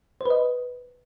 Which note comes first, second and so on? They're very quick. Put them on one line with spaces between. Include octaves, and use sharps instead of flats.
C5 B4 D#5